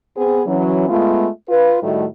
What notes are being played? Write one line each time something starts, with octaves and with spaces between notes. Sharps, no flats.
B3 C4 G#4
E3 F#3 C#4
G#3 A3 B3 F4
F4 B4
A2 D#3 G3 A3 D#4 F#4